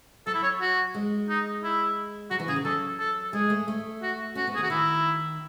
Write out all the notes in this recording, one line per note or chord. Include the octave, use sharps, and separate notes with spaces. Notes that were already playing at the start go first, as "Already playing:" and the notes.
F#3 A4
E4
C#5
F#4
G#3
D#4
E4
F#3 F#4
E3
C#3 G#4
D#3
F#3 A4
A4
G#3 G#4
A3
A3
F#4
C#4 F#4
B3
G#4
D#3
F#4
D#3 E4